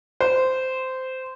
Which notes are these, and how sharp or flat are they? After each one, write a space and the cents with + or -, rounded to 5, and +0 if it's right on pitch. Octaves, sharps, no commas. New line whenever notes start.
C5 -15